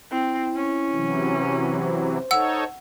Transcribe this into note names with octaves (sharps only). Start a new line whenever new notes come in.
C4 E4
C#4
C3 E3 F#3
C5
D#4 A4 C#5 F#5 E6